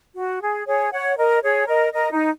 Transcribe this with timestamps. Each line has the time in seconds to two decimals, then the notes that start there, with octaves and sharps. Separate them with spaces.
0.16 F#4
0.42 G#4
0.67 G#4 C#5
0.91 C#5 F#5
1.17 A#4 D#5
1.43 G#4 C#5
1.67 A#4 D#5
1.93 A#4 D#5
2.12 D#4